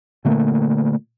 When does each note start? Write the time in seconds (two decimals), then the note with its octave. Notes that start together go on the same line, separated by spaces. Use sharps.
0.25 A#2 D3 A3 A#3